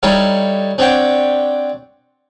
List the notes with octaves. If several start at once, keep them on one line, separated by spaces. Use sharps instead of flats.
G3 D#4 E4 A4 C#5 F5
C4 D4 C#5 F#5 G5